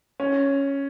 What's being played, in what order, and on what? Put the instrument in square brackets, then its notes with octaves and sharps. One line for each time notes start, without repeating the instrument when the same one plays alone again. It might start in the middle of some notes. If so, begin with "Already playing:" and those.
[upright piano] C#4